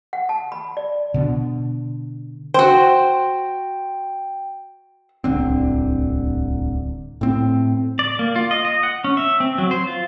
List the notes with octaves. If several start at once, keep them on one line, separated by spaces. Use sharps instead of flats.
F#5
A5
B5
D5
B2 D3
F#4 C5 G5
D1 C2 D3 C4
A2 C4
D5
A#3
F4
D#5
D#5
F#5
C#4
E5
C4
F#3
C5
F4